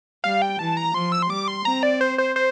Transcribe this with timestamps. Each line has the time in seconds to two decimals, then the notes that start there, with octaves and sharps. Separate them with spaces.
0.24 G3 F5
0.42 G5
0.59 E3 A5
0.77 A#5
0.94 F3 C6
1.12 E6
1.22 C6
1.29 G3 D6
1.48 C6
1.65 C4 A#5
1.83 D5
2.01 C5
2.18 C5
2.36 C5